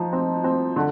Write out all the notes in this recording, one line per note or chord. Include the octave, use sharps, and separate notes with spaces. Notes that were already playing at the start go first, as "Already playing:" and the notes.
Already playing: F3 D#4
C4
C4
D3